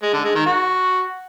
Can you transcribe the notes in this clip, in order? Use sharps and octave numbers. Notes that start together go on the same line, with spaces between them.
G#3
D3
G#3
D#3
F#4